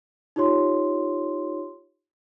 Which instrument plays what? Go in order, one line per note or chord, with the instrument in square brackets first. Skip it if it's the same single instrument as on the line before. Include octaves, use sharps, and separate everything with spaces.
[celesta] D#4 F4 G4 C#5 C6